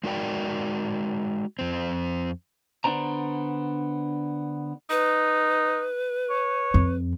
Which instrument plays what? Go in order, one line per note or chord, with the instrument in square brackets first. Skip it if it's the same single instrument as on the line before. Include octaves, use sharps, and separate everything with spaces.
[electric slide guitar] G#3 D#4 F#4 A#4 D5 G5
F2 C4
[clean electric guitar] D3 B3 D4 C5 A#5
[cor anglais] D#4 [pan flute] B4
[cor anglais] C#5
[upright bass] F2